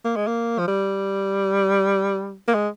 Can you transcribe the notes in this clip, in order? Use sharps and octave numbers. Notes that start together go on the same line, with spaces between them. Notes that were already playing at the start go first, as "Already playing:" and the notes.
A#3
G#3
A#3
F3
G3
A#3
G#3